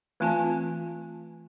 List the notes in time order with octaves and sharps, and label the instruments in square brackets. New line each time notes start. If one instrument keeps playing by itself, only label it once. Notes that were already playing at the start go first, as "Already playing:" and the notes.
[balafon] E3 A3 C4 F4 G#5 A5